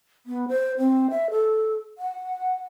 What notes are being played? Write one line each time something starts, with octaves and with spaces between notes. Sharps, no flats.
B3
C5
C4
E5
A4
F#5